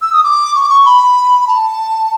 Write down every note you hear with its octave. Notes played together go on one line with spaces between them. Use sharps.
E6
D#6
D6
C#6
D6
C#6
B5
A5